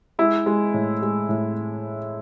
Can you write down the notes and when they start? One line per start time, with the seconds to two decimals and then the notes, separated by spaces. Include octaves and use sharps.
0.19 G#3 E4
0.46 G#3
0.74 A2
1.02 G#3
1.29 A2